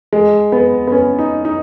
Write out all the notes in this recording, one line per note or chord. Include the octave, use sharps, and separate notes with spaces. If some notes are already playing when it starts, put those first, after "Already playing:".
G#3
B3
B3
C#4
D#4
D#4